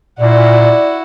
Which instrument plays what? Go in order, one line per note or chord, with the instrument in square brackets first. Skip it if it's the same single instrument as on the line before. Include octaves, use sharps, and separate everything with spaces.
[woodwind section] A#2 [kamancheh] E4 F#4 [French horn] D5